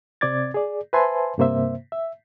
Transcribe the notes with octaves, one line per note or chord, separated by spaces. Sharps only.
C3 C4 D5 D6 G#6 A6
G#4 D5
B4 C5 E5 G#5 A5 C6
G2 C3 A#3 C5 E5
E5